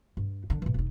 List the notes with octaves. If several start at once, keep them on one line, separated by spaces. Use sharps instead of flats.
G2
D3 D4
A#2 E3
E1 D#4